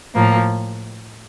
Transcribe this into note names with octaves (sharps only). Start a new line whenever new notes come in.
A2 F3 A#3